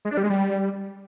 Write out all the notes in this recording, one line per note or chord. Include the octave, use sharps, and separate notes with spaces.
G#3
D4
G3
G#3
G3